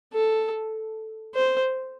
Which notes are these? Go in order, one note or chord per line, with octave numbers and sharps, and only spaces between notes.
A4
C5